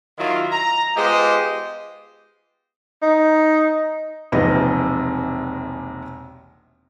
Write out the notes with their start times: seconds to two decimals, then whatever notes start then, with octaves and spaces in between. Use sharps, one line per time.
0.19 D#3 F#3 E4 F4
0.52 A#5
0.97 G#3 B3 F4 G4 C5 D#5
3.02 D#4
4.32 E1 A#1 C3 D#4 B4 D#5